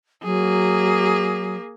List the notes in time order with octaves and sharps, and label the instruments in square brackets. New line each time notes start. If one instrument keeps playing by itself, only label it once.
[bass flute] F#3 [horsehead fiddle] A#3 G#4